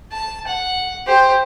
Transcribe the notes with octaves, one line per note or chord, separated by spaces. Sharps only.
A5
F#5
G4 C5